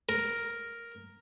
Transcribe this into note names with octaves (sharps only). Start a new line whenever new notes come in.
A#4